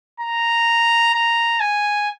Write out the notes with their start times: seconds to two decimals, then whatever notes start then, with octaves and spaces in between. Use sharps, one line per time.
0.20 A#5
1.14 A#5
1.60 G#5